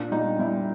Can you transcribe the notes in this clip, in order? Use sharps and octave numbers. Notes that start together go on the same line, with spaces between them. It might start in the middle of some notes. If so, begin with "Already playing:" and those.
Already playing: A#2 D4
G3 D#4
G3 E4